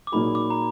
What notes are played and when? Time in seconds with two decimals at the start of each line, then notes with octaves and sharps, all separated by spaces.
0.07 D6
0.12 A#2 F#3 A#3 D#4 G#4 B5
0.35 D6
0.50 A#5